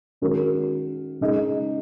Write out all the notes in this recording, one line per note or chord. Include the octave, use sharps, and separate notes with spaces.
D#3 G#3 C#4 F#4 A#4
C#3 G#3 D#4 G#4 D#5